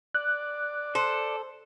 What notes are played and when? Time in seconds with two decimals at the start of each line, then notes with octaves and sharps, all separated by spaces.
0.15 D5 F#6
0.95 A4 C5